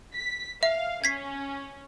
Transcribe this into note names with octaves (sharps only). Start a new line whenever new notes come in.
B6
E5 F5
C#4 G#6 B6 C7